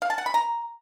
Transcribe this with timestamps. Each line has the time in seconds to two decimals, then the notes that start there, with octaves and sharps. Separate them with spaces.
0.02 F5
0.10 A5
0.18 F#5
0.26 B5
0.34 A#5